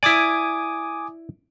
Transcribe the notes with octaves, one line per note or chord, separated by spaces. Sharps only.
E4 D5 G#5 D6 D#6